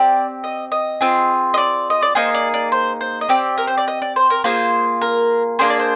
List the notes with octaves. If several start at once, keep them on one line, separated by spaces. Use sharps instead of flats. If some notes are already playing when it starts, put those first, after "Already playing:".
Already playing: C4 G4 D5
D#5
D#5
C4 F4 G#4
D#5
D5
D#5
D5
A#3 D#4 G#4 C5
D5
D5
C5
C5
D#5
C4 G4 D5
A#4
C5
D5
D#5
D5
C5
A#4
A#3 F4 G#4 C5
A#4
A#3 D4 G#4 C5
D5
C5